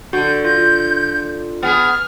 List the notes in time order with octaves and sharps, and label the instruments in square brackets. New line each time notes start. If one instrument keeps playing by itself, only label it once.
[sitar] D3 [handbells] F#4 [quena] G6
[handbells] F4 [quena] G6
[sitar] B3 G#4 [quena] F6